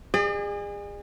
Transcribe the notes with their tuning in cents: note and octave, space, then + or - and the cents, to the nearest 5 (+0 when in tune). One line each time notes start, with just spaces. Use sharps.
G#4 -30 D5 +45